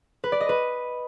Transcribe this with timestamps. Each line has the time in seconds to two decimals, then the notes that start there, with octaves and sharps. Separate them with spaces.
0.24 B4
0.32 D5
0.41 D#5
0.49 B4